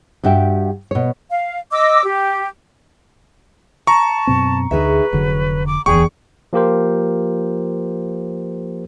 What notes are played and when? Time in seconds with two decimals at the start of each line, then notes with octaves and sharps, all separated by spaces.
0.24 G2 F#4 G4 E5 G5
0.91 B2 C#5
1.31 F5
1.72 D#5 D6 E6
2.04 G4
3.87 A5 A#5 C#6
4.27 F#2 B2 C4
4.71 D2 D#4 G#4 B4 E5
5.13 F1 D3 F#3
5.67 D6
5.86 D1 E2 F3 G#4 G5 C#6
6.53 F3 A#3 F4 G4 A#4 C5